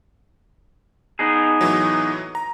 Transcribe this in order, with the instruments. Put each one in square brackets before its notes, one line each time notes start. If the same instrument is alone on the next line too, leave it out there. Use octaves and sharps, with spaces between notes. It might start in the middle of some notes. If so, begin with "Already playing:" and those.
[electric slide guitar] B3 D#4 G#4
[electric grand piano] A2 E3 F#3
A#5